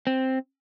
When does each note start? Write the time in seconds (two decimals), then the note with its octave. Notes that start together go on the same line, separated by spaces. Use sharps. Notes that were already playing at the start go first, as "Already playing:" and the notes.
0.07 C4